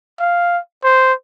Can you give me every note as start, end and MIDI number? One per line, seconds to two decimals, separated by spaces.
0.20 0.59 77
0.84 1.13 72